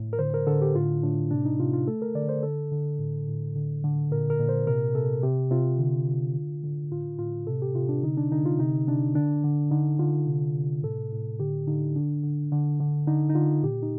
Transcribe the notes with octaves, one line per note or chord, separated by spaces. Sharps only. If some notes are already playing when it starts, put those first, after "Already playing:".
Already playing: A2
A#4
D3 C5
A#4
D3 A4
G4
A2 F4
A2 D4
C3 D4
D#4
C3 F4
F4
A3 A4
A#4
D3 D5
C5
D3 A4
D3
A2
A2
D3
D3
A#2 A#4
A#4
A#2
C5
C3 A#4
C3 A4
C3 G4
C3 F4
D3
D3
D3
D3
A2 F4
A2 F4
C3 A4
G4
C3 F4
D4
D3 D#4
D4
D3 D#4
F4
C3 D#4
C3 D4
D3 D4
D3
D3 D#4
D3 F4
C3
C3
A2 A4
A2
D3 G4
D3 D#4
D3 D4
D3
D3
D3
D3 D#4
D#4
D3 F4
A#2 G4
D#4